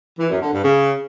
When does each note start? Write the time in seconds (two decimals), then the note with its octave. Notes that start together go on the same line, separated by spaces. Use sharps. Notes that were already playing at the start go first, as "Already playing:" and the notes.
0.19 E3
0.30 F#2
0.41 D3
0.52 G2
0.63 C#3